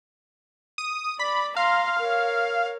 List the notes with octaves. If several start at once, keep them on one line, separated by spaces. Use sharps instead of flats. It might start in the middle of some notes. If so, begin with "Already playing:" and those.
D#6
D5 B5
F5 A#5 C6
A#4 C#5